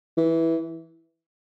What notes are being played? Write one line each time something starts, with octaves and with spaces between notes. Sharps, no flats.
E3